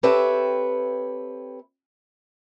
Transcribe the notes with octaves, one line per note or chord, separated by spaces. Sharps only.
C4 G4 A4 B4 C#5 E5